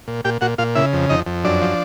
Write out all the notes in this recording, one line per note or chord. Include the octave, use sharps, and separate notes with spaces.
A#2
A#2 G4 G5
A#2 F#4 F#5
A#2 F4 F5
C#3 E4 E5
F2
F2 D#4 D#5
F2
F#2 D4 D5
F3